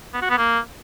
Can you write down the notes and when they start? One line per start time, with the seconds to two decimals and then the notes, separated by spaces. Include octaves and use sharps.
0.14 B3
0.22 F#4
0.30 B3
0.38 A#3